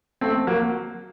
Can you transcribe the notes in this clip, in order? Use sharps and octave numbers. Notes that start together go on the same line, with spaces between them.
A3 C4
F#3 A#3